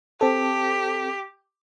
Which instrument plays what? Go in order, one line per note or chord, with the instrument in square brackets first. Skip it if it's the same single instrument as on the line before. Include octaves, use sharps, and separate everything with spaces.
[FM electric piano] C4 A4 [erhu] G4